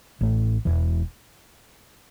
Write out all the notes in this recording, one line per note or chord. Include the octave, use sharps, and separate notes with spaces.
A1 A2 A3
E1 E2 E3